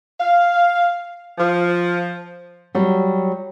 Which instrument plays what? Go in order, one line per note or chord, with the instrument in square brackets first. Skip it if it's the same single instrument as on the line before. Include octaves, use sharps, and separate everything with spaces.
[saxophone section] F5
F3
[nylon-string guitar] F#3 G3